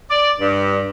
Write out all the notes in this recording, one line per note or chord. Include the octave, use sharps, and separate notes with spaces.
D5
G2